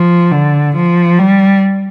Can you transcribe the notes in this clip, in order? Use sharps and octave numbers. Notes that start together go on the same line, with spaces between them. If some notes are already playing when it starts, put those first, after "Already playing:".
Already playing: F3
D3
F3
G3